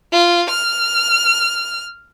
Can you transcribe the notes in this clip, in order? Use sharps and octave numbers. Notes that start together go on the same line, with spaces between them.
F4
F6